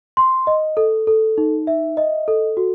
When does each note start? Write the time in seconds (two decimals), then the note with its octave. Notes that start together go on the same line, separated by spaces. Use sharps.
0.17 C6
0.47 D#5
0.77 A4
1.07 A4
1.38 D#4
1.67 E5
1.97 D#5
2.28 A4
2.57 F#4